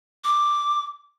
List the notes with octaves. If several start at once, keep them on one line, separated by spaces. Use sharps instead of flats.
D6